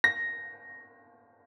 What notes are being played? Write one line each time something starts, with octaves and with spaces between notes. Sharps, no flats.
A#6